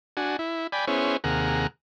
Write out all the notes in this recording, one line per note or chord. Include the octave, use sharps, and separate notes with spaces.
D4 F#4 G#5
E4
D5 G5 G#5 B5
B3 C#4 E4 G#4 C5 C#5
D#2 C3 A#3 G#4 F#5 A#5